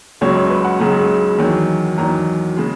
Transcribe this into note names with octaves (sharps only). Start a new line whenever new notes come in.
C#2 C#3 F#3 C#5
C#5
B4
F#5
C#2 C#3 F#3 A#5
E2 D#3 F#3
E2 D#3 F#3 A#5
C#3 G#3